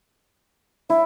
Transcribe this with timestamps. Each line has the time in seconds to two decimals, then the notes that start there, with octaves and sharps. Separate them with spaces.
0.90 E4 E5